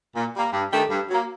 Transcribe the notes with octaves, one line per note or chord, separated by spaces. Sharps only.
A#2
G3 A#3
G2
D#3 A3 D4 G4
G2
F#3 A#3